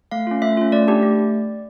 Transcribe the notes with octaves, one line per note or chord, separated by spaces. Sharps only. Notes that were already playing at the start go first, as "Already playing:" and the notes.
A3 F5
C#4 F4
A3 E5
C#4 F4
A3 D5
D4 G4
A3